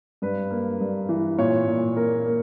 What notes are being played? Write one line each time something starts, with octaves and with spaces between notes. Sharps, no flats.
G2 B4
A#3
G2
E3
A#2 C#5
A#2
A#3 A#4
A#3